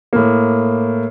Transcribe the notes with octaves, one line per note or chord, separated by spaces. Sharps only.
A2 A#3